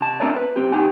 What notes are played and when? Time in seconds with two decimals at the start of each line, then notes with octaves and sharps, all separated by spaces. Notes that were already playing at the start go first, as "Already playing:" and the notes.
0.01 C3 A5
0.20 C4 D4 E4 A#4 C#5 D5
0.36 B4
0.56 B1 C4 G4
0.72 D2 D#4 G4 G#5